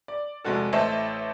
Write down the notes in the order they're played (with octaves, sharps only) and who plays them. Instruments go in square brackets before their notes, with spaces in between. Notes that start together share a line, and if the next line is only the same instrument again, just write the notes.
[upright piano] D5
F1 C3 G#3 F#4 A4
A1 A3 C5 D#5 E5 A5